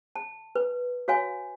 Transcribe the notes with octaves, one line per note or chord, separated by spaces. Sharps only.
A5
B4
F#4 C#5 F5 G#5